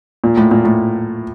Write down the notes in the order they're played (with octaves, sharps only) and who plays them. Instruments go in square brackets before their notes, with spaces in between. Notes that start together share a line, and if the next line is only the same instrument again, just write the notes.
[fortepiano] A#2
A2
A#2
A2